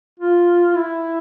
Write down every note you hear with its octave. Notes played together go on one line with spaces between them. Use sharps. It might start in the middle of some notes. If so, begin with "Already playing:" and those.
F4
E4